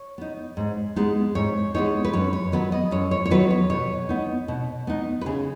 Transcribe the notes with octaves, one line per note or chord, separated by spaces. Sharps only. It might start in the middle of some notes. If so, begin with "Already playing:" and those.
Already playing: C#5
B3 D#4
G#2
G#3 B3 D#4
G#2 C#5
G#3 B3 D#4 C#5
B4
F#2 C#5
C#5
D#3 F#3 B3 B4
D#5
F#2 C#5
C#5
C#5
D#3 F#3 B3 B4
C#5
B2 C#5
B3 D#4
B2
B3 D#4
B4
C#3 G#4